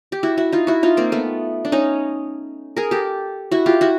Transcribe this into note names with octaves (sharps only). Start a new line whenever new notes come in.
G4
E4 F#4
E4 F#4
D#4 F4
E4 F#4
D#4 F4
A#3 C4
A3 B3
D4
C#4 D#4
G#4 A#4
G4 A4
E4 F#4
F4 G4
E4 F#4